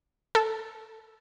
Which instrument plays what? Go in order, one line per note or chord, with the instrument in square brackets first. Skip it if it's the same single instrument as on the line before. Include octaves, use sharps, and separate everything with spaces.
[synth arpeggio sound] A4